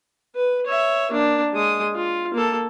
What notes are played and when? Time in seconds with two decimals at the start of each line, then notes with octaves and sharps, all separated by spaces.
0.35 B4
0.66 C#5 E5
1.11 A#3 D4
1.53 G#3 D#6
1.95 F4
2.34 A#3 A4